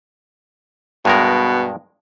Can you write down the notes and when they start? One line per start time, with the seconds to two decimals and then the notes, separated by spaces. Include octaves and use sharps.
1.05 G2 B2 G#3 A#4